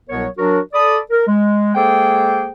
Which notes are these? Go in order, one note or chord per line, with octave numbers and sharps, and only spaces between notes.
C2 B2 F#3 B3 A#4 C#5
F#3 D4 F#4 A#4
A4 D5 B5 D#6
A#4
G#3
G#3 A#3 G#4 A4 C5 G5